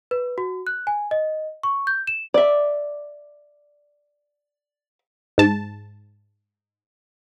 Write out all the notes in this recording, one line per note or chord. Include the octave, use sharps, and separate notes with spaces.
B4
F#4
F#6
G#5
D#5
C#6
G6
E7
D5 E5
G#2 A5